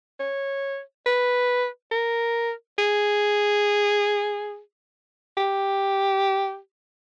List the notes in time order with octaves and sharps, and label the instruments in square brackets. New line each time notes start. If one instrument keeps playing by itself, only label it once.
[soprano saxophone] C#5
B4
A#4
G#4
G4